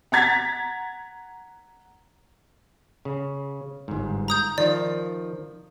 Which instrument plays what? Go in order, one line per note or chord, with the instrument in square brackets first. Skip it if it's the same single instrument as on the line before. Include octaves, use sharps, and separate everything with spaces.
[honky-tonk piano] F#5 A#5 G#6 A6 B6
[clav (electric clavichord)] C#3
G1 G#2
[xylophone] A#5 D#6 G6
[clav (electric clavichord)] D#3 F3 [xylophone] D5